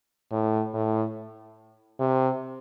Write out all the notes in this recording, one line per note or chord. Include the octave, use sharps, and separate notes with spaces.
A2
A2
C3